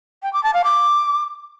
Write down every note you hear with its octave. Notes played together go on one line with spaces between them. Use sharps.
G5
D6
A5
F5
D6